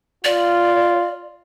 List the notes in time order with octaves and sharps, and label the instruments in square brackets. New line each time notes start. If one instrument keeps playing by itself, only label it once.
[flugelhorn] F4 [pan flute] D5